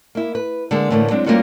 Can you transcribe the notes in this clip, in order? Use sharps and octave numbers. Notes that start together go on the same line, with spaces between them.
A#3 E4
B4
D3 G#3 A#3 G#4
A2 D3 E3 A3 A#3
F#3 G#3 C4 D4
G3 A#3 B3 C#4 F4 F#4